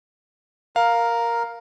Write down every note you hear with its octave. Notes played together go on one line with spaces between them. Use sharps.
A#4 F5